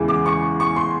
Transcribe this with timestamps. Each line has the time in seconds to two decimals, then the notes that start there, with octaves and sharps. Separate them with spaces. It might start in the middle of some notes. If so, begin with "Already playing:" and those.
Already playing: E2 C#3 E3 G#3
0.08 D6
0.26 C#6
0.60 C#6
0.76 C6